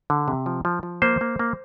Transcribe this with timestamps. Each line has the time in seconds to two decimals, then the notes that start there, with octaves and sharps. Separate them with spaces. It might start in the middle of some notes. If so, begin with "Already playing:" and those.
0.10 D3
0.28 C3
0.46 F3
0.65 F3
0.83 F3
1.02 A#3 C5
1.21 A#3
1.39 A#3